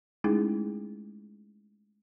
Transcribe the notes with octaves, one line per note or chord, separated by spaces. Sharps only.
G#3 A3 C#4 D#4 E4 G#4